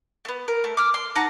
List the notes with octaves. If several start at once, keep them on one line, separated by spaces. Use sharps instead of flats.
A3 B3
A#4
A3
D6 F6
C6
D#4 F#5 A5 A#5